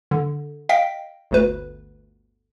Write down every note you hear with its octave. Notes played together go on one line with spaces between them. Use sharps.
D3
D#5 F5 G5 B6
G1 D2 B4